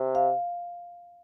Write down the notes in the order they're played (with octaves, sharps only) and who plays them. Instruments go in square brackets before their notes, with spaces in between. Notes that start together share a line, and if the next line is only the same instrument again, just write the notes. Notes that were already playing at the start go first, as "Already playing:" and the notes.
Already playing: [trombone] C3
[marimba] F5